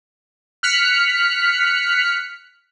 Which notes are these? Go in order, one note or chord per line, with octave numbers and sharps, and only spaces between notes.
F6 F#6 B6 C#7